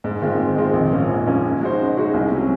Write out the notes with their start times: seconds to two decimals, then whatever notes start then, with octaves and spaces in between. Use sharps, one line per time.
0.04 G#2
0.22 D#3 G#3 C4 F4
0.39 G#2
0.56 D#3 G#3 C4 F4
0.73 A#1
0.91 G#2 F3 A#3 C#4
1.09 A#1
1.26 G#2 F3 A#3 C#4
1.44 C#3
1.61 G#3 D#4 F#4 C5
1.79 C#3
1.97 G#3 D#4 F#4 C5
2.14 C2
2.31 C3 F#3 C#4